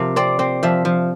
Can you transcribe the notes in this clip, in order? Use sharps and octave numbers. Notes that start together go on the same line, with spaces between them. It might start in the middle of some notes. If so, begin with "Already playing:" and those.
Already playing: C3 F3 A#4
C4 D5
C4
F3 E5
F3